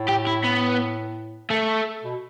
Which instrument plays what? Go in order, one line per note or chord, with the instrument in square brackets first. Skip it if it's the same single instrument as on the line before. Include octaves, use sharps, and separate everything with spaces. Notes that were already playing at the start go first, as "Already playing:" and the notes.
Already playing: [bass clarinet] A2
[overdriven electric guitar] G4
E4
B3
A3
[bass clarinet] B2